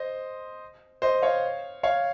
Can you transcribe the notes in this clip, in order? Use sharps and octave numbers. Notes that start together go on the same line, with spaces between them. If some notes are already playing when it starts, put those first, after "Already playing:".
Already playing: C5 D#5
C5 D#5
C#5 F5
C#5 F5